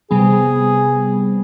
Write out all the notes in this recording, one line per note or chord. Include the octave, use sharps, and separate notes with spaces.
C3 G3 B3 G#4